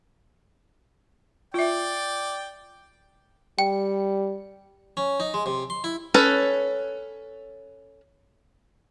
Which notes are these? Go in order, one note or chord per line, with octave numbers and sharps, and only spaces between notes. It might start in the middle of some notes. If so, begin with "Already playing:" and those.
F4 D5 E5 G5
G3 G5
C#4
D#4
G#3
C3
C6
E4
C#4 A4 B4